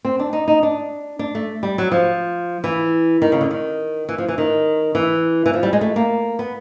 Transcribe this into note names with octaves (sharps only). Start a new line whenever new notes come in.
C4
D4
D#4
D#4
D4
D4
A3
G3
F#3
F3
E3
D#3
C#3
D3
D#3
E3
F3
E3
D#3
E3
E3
F3
G3
G#3
A3
A#3
B3